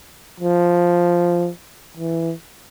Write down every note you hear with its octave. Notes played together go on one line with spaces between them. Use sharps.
F3
E3